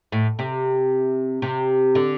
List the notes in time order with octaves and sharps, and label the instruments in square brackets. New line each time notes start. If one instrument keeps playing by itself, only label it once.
[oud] A2
C3
C3
D3